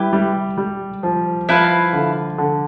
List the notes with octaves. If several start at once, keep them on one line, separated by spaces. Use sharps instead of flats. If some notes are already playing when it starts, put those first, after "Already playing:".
Already playing: G3 E4 G4 B4
G3
G3
F3
F3 E4 B4 F5
D3
D3